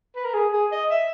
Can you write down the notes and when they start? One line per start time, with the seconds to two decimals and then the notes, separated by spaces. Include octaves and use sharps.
0.16 B4
0.25 A#4
0.34 G#4
0.53 G#4
0.72 D#5
0.91 E5